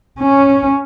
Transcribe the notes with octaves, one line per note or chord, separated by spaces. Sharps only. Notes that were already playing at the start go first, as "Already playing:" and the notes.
C#4